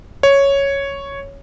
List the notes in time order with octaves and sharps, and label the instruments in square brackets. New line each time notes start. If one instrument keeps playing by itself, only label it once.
[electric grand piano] C#5